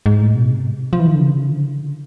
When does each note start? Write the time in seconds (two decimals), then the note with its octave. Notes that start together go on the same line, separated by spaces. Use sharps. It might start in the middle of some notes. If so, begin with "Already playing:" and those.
0.06 G#2
0.21 A2
0.35 B2
0.50 C3
0.93 F3
1.00 E3
1.07 D#3
1.14 D3
1.21 C#3
1.51 D3